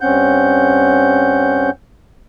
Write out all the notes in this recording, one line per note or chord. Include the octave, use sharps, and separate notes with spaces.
G2 C4 C#4 F#5 G6